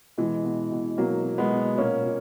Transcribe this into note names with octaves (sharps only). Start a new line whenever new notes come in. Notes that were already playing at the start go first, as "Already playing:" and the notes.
B2 E3 G#3
B2
B2
B2 F#3 A#3
B2
G#3 B3
B2
A#2 A#3 C#4
A#2